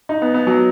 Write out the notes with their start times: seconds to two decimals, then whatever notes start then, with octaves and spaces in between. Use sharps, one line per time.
0.09 D#4
0.22 B3
0.34 B3
0.47 F#3